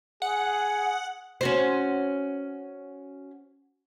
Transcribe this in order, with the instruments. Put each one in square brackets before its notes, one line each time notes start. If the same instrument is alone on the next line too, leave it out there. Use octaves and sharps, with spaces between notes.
[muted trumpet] G#4 [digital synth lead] F#5
[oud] C#4 F#4 C5